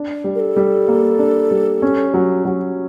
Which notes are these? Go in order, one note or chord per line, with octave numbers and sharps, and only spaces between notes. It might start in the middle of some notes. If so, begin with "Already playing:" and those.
Already playing: D4
G3
A#4
A4
G3
A#3
D4
G3
C#4
F#3
F#3